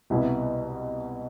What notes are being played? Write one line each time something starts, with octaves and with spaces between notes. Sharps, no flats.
C2 B2 B3 E4